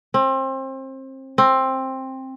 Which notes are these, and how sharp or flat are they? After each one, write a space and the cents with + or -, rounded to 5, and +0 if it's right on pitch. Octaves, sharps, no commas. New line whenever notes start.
C4 +30
C4 +15